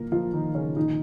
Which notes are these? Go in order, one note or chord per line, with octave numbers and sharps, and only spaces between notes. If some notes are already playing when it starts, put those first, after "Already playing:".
Already playing: A#2 F3 A#3 A#4
F3 F4
D#3 D#4
C#3 C#4
A#2 D#3 F3 D#4